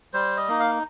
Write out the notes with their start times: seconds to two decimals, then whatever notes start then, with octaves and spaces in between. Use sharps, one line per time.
0.13 G3 C5
0.37 D#5
0.48 A#3 D#4
0.60 F5